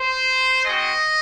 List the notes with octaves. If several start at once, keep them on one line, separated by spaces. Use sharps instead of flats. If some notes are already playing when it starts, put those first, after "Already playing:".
Already playing: C5
G#3 C4 F#4 D#5